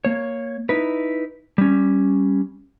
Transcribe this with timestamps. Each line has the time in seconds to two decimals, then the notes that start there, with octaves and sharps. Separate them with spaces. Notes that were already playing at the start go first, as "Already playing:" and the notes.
0.05 A#3 C#5
0.69 D#4 E4 B4
1.58 G3 C#4